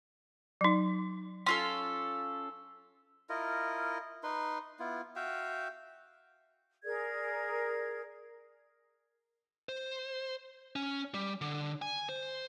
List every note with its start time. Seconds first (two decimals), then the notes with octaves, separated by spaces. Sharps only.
0.61 F#3 D#4
1.46 C#4 F4 A4 C6
3.30 E4 F4 A#4 D#5
4.23 D#4 B4 C6
4.79 B3 E4 F4
5.16 F#4 E5 F5 G5
6.84 G#4 A#4 D5 G#6
9.69 C5
10.76 C#4
11.14 G3
11.41 D3
11.82 G#5
12.09 C5